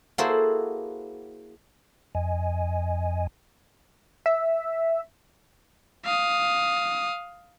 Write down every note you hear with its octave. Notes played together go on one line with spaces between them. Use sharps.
A#3 E4 F#4 G#4 A4 C5
F2 D#5 G#5
E5
F5 D#6